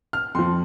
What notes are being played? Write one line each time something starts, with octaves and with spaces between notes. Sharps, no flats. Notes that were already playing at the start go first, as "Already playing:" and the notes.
F6
F2 F3 C6